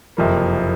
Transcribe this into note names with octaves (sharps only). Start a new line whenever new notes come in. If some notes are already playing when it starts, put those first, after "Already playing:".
F#1 F2 C3 F3 A#3